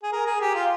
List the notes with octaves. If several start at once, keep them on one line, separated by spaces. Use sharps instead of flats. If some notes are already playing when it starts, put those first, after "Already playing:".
G#4
A#4
G#4
G4
F4